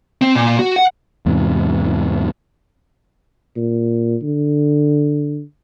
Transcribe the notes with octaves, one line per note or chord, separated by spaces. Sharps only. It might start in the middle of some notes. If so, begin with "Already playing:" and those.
C4
A#2
F#4
F#5
E2 G#2 C3
A#2
D3